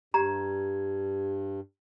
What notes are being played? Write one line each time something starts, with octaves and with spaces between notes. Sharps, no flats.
G2 G4 A#5 G#6